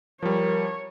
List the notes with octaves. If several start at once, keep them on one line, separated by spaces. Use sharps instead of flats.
F3 G3 A#4 C#5